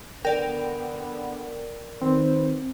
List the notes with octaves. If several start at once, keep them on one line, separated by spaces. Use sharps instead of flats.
D3 B3 A#4 D5 G5
D#3 C4 B4 C5